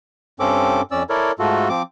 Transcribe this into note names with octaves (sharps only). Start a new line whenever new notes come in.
G2 C4 C#4 A4 D6
F2 C#4 D5 E6
E4 A4 A#4 C#5 D5
G#2 A3 F4 F#4 A4
F3 C4 D6